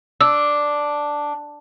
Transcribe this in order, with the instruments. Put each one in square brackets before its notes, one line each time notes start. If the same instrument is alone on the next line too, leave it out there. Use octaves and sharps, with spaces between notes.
[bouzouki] D4 [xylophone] E6